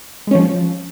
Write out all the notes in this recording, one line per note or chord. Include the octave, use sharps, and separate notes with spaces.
F3 G#3 C#4